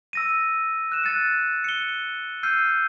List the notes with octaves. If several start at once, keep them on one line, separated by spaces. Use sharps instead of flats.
E6 A#6 D#7
F#6 E7
F#6 A6 C#7 D#7
C#7 G7
E6 F6 G6 C7 D#7